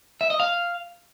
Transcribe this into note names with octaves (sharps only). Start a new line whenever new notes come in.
E5
D#5
F5